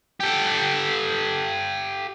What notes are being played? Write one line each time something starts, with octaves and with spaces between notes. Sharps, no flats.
G4 A4